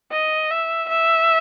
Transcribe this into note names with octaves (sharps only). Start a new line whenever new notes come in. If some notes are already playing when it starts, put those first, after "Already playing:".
D#5
E5
E5